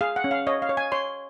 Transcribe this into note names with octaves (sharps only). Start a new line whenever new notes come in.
G#4 F5
F#5
C#4
F5
C#5 D#5
F5
C#5
G#5
C#5 C6